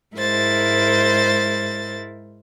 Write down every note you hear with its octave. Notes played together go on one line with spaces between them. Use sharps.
G#2 G#3 E4 A#4 C5 A6